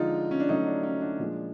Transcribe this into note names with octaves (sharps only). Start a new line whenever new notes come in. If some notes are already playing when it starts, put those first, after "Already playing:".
Already playing: D3 F3 G#3 D#4 F4
C#4
D4
D3 F#3 A3 C#4 D#4
D4
C#4
D4
A#2 F3 G#3